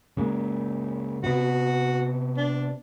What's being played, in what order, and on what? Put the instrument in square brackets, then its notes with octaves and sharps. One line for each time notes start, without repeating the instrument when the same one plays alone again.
[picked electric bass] C#3 G#3 A#3
[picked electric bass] C3 B3 [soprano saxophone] F#4
[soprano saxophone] D4